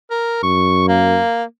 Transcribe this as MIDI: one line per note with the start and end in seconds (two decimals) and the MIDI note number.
0.10 0.40 70
0.43 1.19 42
0.43 0.84 85
0.88 1.43 58